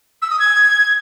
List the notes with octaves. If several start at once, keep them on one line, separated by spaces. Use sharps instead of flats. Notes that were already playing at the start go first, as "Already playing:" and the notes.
E6
D#6
G#6